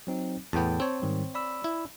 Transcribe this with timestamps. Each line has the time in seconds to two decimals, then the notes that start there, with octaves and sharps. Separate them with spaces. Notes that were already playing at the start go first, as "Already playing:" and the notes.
0.07 F#3 C4 D#4
0.53 E2 A2 B3 G5 A5
0.80 C4 C#5
1.02 G#2 D#3 G3
1.35 D5 B5 E6
1.64 E4